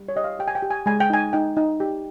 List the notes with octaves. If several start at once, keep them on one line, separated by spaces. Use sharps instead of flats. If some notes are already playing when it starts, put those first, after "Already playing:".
Already playing: G3
C#5
G4 D#5
F5
G4 G5
G#5
G5
G4
G#5
G#3 G#5
G5
D#4 G#5
D#4 G5
D#4
G4